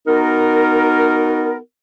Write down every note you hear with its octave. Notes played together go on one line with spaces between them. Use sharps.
B3 D#4 F#4 A#4